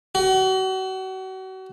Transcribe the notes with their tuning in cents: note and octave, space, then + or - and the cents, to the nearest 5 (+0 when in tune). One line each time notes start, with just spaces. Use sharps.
F#4 +35